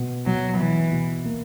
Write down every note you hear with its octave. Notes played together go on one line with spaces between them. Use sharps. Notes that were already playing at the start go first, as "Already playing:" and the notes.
Already playing: B2
B2 F#3
B2 E3
B2
A#3